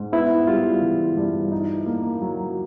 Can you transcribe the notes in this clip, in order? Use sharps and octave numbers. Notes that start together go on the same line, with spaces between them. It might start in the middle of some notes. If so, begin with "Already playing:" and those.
Already playing: G#2
B3 E4
G3 F4
E3
G2
D#4
A#3
F#3